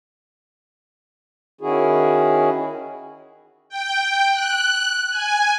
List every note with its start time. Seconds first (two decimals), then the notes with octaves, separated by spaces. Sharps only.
1.61 D#3 C#4 E4 F#4 G#4
3.69 G5
4.32 F#6
5.11 G#5